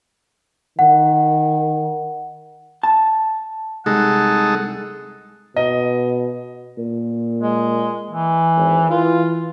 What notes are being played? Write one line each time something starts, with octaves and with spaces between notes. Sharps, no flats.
D#3 F#5
A5
C2 G#3 D#4 A4 F#5
B2 D#5
A#2
G#3
E3
G#1
E3 F4